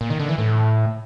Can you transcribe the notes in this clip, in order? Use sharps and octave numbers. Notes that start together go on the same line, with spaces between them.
A#2
D#3
D3
E3
A2